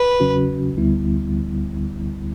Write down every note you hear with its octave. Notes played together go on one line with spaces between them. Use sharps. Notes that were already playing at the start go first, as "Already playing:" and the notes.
Already playing: B4
E2 C#3 F#3 C#4 F#4
D2 D3 G3 B3 E4